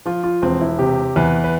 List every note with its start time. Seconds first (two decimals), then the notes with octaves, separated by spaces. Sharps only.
0.06 F3 F4
0.24 F4
0.42 E1 C4
0.61 E4
0.79 C3 G4
1.16 E2 B4
1.44 B4